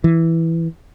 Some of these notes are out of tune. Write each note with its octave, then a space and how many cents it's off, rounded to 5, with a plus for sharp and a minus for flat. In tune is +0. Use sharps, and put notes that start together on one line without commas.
E3 +0